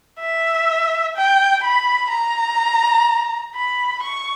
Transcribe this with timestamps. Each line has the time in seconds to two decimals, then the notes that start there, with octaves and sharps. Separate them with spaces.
0.20 E5
1.16 G5
1.63 B5
2.11 A#5
3.55 B5
4.02 C#6